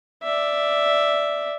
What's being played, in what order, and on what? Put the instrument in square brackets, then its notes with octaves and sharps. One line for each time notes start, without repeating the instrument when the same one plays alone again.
[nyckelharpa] D5 E5